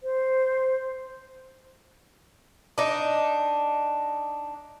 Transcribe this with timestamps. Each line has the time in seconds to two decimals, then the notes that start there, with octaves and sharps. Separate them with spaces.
0.03 C5
2.78 D4 D#4